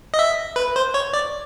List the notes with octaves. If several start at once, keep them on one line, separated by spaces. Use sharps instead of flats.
D#5
E5
B4
C5
C#5
D5